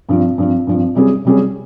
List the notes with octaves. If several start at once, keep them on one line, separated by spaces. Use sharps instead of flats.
G2 F3 C4
G2 F3 C4
G2 F3 C4
C3 G3 C#4 G#4
C3 G3 C#4 G#4